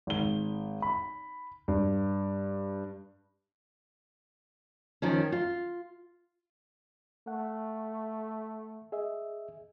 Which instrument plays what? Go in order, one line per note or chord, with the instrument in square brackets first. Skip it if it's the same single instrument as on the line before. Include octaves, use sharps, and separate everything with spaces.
[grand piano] G#1 G7
B5
G2
[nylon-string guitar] D#3 F3 C#4
F4
[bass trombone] A3 [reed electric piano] F#5
[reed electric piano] G#4 D#5 E5